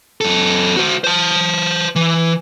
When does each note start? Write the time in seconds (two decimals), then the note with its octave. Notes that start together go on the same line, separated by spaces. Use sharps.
0.21 F#2 A4
0.76 F#4 C5
1.04 C5 A5
1.95 E3